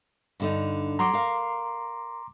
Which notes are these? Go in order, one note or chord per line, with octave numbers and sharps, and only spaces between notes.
G2 D3 D#4
F#3 A#5 C6 D6
A#4 F5